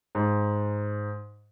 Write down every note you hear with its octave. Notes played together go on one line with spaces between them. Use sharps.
G#2